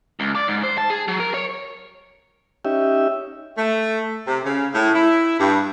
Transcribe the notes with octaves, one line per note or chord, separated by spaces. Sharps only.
C#2
D5
G#2
C5
A5
G#4
F#3
A#4
C#5
C#4 D#4 G4 E5
A3
C3
C#3
A2
E4
G2